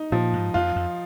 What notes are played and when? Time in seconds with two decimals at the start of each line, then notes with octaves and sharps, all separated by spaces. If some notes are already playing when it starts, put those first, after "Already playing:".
Already playing: D#4
0.12 A#2 F3
0.33 G#2
0.54 F2 F4
0.76 F2